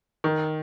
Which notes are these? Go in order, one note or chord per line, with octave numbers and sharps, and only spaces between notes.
D#3